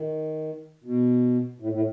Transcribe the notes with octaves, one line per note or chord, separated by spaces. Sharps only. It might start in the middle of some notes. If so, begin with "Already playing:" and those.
Already playing: D#3
B2
A2
A2